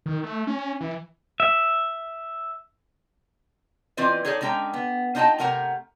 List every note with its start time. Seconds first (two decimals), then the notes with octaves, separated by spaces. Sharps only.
0.06 D#3
0.23 A3
0.47 C#4
0.80 E3
1.40 E5
3.97 E3 C4 F4 B4 D5 D#5
4.25 D#4 G#4 A4 C#5 D5
4.41 D3 G#3 C#4 G5 A#5
4.74 B3
5.15 D4 D#4 F4 D#5 G5 A5
5.38 C3 A3 A#4 F#5 G#5 A#5